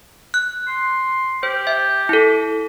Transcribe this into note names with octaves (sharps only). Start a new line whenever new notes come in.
F#6
C6
G4 C5
E5
E4 A4